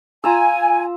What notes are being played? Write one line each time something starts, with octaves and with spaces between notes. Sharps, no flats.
F4 G#5 A#5 E6